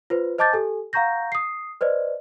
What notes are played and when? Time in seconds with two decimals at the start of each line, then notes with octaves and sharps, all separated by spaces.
0.10 F4 B4 C5
0.38 C5 D#5 A5 D6 G6 A6
0.52 G4 A4 G#5
0.93 F5 F#5 A#5 C#6 G6 A#6
1.32 D#6 C7
1.81 B4 C5 D5 D#5